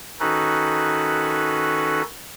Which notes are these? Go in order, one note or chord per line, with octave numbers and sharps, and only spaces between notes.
D#3 C#4 D#4 F#4 A4 B4